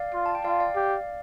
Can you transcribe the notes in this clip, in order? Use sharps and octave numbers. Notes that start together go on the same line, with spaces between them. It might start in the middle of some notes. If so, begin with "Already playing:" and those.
Already playing: D5 F5
F4
A5
G5
F4 D5 F5
D5 F5
G4